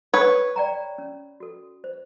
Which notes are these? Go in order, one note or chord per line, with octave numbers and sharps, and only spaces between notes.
A4 B4 C#5
D5 G5 A#5
C#4
F#4 A4
C5